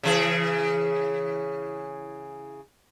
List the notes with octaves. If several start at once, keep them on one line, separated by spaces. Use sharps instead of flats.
C#3 E3 G#4